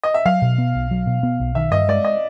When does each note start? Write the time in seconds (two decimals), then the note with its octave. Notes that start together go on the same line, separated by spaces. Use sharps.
0.04 D#5
0.14 E5
0.25 F#3 F5
0.42 B2
0.58 B3
0.75 B1
0.91 F#3
1.07 B2
1.23 B3
1.40 B1
1.55 D#3 E5
1.71 G2 D#5
1.88 G#3 D5
2.05 D#5